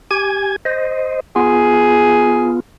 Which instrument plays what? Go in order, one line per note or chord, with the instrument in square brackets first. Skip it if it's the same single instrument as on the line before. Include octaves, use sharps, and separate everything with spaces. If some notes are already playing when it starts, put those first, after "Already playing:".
[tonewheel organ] G4 G#5 G#6
C5 D#5
[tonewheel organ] B3 F4 [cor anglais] G#4